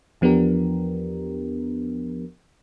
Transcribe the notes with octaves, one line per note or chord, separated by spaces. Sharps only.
E2 F3 B3 D4 G4 A#4